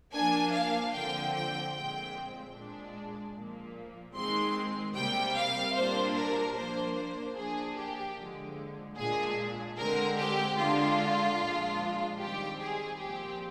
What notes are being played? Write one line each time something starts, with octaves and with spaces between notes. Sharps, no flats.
F3 A#3 D4 G#5
F5
D3 F3 C4 G5
G5
A#2 G#3 C4 G5
A#2 G#3 D4
A#2 F3 A#3
D#3 G#3 C4 C6
C3 G3 A#3 G5
F5
A#2 G3 A#3 D4 C5
A#4
F3 A#3 D4 C5
C5
F3 A#3 D4 G#4
G4
D3 F3 G#3
A#2 G#3 D4 G#4
D3 G#3 C4 A#4
G4
D3 G#3 D4 F4
A#2 F3 G#3 D4
D#3 G3 C4 G4
G#4
A#2 F3 C4 G4